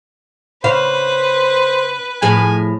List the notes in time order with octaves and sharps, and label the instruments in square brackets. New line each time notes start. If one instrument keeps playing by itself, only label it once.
[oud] C#3 F5 [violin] B4 [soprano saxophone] C5
[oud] A2 F3 G#4 [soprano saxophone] G#5